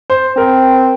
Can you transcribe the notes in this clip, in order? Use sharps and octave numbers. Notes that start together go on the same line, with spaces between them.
C5
C4 A#4